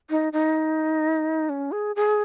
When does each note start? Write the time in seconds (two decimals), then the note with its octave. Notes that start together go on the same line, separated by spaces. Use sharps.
0.10 D#4
0.33 D#4
1.49 C#4
1.72 G#4
1.96 G#4